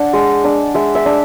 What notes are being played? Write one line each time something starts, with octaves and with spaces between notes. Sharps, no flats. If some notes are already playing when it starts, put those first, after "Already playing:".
Already playing: D4 F#5
G#3
D4
G#3 E5
E5
D4